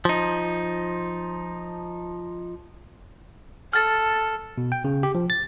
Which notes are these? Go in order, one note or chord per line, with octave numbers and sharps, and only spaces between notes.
F3 D#4
A4 F6 A6
B2
G5
C#3
G4
F3
A6